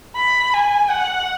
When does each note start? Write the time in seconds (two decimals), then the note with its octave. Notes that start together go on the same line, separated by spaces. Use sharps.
0.16 B5
0.54 G#5
0.90 F#5